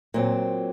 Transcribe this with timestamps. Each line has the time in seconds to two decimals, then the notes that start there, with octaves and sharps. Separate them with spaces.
0.14 A#2 F#3 C4